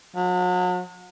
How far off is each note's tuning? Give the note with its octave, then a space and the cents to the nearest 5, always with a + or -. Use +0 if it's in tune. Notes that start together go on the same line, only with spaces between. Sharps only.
F#3 -40